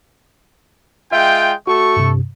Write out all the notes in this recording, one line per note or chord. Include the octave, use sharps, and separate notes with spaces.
G#3 F4 E5 G5
A3 F#4 A4 C#6
G2 C3